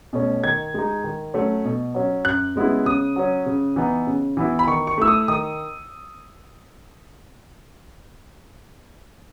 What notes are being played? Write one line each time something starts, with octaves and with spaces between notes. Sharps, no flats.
B2 A3 C#4
D#3 G#6
G#3 D#4
D#3
F#3 A3 C#4
B2
F#3 C#4
F#2 F#6
C#3 G#3 B3 E4
C#3 D#6
F#3 C#4
C#3
E3 B3 D#4
C#3
E3 B3 E4
B5
D#3 C#6
C#6
A3 E4 E6
D#6
D#3 D#6